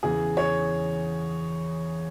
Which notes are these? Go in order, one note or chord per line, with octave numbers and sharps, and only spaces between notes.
E2 C#3 E3 G#4
C#5